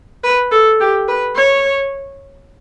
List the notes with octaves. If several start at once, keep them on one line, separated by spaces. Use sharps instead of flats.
B4
A4
G4
B4
C#5